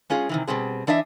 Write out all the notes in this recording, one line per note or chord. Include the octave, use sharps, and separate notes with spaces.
G#3 C#4 F4 G#4
C3 D#3 E3
B2 G3 C4 G#4
E3 D4 D#5 E5